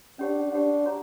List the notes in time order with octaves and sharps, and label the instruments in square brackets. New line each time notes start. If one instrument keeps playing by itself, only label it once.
[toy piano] C#4 G4 C#5 F#5 [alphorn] D4
[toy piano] C#4 G4 C#5 F#5 [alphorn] D4
[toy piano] F#4 C#5 F#5 A#5